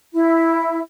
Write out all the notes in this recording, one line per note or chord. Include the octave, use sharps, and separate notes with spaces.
E4